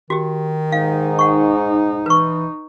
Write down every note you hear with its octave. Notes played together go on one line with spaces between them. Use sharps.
D#3 F#4 G4
G#2 D#4 F5
F#5 C#6
E3 B4 C#6